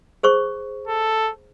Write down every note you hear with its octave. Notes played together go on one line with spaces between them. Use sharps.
G#4 C5 C#6
A4